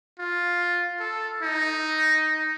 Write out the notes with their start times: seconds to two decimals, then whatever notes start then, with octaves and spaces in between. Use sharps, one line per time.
0.19 F4
1.00 A4
1.43 D#4